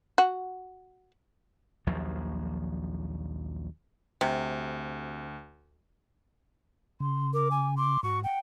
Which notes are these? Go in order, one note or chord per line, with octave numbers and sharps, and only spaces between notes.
F#4
A#1 D#2 F3 F#3
D2 C3
C#3 C6
A#4 D6
G#5
C6 D6
G#2 F#4 C#6
F#5 G5